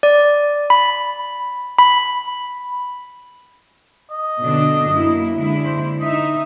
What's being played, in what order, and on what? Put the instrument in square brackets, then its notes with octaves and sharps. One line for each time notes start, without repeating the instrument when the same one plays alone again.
[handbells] D5
B5
B5
[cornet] D#5
[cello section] B2 D3 D4
F#2 A#3 E4
D3 G#3 E4
[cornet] C5
[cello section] D#4 E5 [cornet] D#5